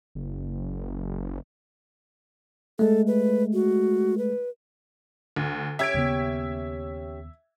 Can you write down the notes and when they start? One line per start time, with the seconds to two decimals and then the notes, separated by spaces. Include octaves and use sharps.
0.15 F#1
2.79 G#3 A3 A4
3.07 B4
3.53 F#4
4.18 B4
5.36 D2
5.79 C#4 G4 C#5 E5 G#6 D7
5.94 D#2 C#3 B3